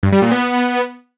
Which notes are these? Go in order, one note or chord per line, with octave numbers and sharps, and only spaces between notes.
G2
G3
A#2
B3